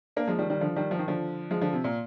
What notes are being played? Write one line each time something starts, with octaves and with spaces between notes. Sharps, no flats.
A#3 D4
F3 G#3
D#3 G3
D#3 G3
D3 F3
D#3 G3
F3
D#3
D3 F3
F3 G#3
D3 F3
C3
A#2